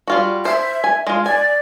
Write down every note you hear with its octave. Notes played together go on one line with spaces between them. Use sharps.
G3 F4 F#4
C5 E5
G#5
G#3 F4
D5 G#5